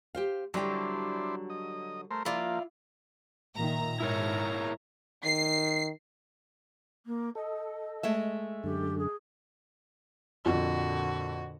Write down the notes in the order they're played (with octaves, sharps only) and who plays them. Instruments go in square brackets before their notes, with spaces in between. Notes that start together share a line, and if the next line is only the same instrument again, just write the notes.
[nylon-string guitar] G4 C5 F5
[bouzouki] D3 F#3 [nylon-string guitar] G3 G4 [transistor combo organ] D4 E4 C5
[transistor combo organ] D#5
A3 A#4 C5
[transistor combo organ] F3 A#3 [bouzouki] E4 F4 D5
[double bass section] A#2 D#3 [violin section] E5 A#5
[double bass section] G#2 [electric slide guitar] E4 A#4 C#5
[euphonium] D#3 [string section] C7
[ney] A#3
[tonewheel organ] A4 [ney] D#5
[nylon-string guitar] G#3 A3 E5
[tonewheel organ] F#2 D3 [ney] G4
[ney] G#4
[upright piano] F2 [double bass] A#2 D3 [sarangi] F#4